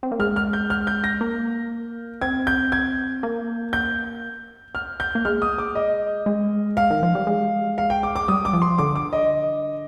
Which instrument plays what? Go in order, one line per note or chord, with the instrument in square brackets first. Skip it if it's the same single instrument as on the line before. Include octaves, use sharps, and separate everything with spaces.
[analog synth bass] C4
A#3
[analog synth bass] G#3 [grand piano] F6
[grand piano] F6
G6
F6
G6
A#6
[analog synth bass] A#3
[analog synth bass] C4 [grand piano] G#6
[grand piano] G6
G#6
[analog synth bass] A#3
[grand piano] G6
F6
G6
[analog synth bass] A#3
[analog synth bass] G#3 [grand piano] F6
[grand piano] D#6
D6
D#5
[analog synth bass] G#3
[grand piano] F5
[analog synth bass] D#3
F3
G3
G#3
[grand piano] F5
G5
D6
D6
[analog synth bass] G3 [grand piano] D#6
[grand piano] D6
[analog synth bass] F3
[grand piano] C6
[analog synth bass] D3 [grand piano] D6
[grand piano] D6
D#5